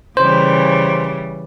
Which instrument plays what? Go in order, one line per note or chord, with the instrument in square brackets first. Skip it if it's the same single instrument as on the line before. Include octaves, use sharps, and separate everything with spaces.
[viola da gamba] C#3 E3 G3 [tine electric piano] C5